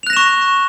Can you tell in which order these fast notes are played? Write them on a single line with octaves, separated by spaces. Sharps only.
F7 F#6 A#6 E7 C#6